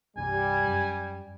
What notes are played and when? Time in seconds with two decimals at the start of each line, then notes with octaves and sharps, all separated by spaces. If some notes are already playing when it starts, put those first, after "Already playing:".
0.17 C2 G2 G3 G#5
0.67 F#2